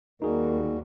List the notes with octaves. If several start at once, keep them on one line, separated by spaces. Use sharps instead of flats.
D#2 G3 A#3 D#4 F#4 G#4 A#4